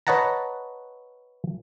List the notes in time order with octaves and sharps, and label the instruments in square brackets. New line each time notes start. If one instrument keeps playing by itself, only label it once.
[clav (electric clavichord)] B4 C#5 D#5 F#5 A5 A#5